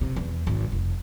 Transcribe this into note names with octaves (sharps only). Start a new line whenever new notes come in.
C3
E2
G#1
F1